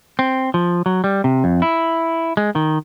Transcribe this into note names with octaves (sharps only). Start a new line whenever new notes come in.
C4
F3
F#3
G3
C3
F2
E4
G#3
D#3